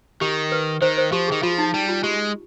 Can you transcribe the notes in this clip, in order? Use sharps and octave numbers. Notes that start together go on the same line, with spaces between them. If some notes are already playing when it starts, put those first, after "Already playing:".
D#3 G4
B4
D#3 C5
C5
F3 G4
D#3 G#4
F3 F4
D#4
G3 D#4
F4
G#3 G4